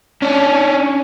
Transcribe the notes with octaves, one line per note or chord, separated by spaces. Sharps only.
C#4 D4